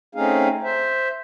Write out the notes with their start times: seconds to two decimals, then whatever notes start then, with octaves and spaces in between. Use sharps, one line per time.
0.15 A3 C4 C#4 D#4 G#4 F5
0.64 C5 E5